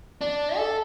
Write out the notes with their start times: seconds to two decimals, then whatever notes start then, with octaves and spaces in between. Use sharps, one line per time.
0.21 D4
0.57 A4